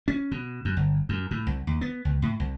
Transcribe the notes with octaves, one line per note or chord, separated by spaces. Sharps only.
C#4
B2
F#2
G1
F#2
A2
C2
D#2
B3
C#2
A2
C2